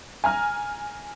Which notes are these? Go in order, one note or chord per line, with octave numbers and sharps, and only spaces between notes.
G#5 A#5 F6